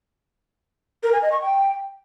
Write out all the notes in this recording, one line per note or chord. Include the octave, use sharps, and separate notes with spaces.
A#4
G#5
D#5
C#6
G5